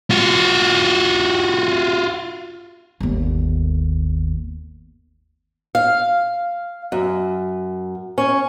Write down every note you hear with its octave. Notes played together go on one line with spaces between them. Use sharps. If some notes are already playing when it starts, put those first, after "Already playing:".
F4 F#4
G1 D#2
F5
F#2
C#4